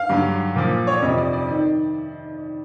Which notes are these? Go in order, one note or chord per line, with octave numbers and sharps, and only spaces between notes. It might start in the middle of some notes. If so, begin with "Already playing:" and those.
Already playing: F5
G2 D3 F#3
A#2 F3
C#5
D5
F2 C3 F3 D#5
D5
D5
D#3